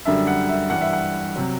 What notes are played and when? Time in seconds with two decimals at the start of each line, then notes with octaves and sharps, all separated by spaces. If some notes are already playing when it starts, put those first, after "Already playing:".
0.05 F#2 D3 G3 E5
0.27 F#5
0.49 E5
0.70 G2 E3 G3 F#5
0.81 E5
0.93 F#5
1.36 C3 F#3